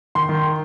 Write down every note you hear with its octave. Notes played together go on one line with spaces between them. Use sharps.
D#3 C6
D#3